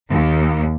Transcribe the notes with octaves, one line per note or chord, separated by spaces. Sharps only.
D#2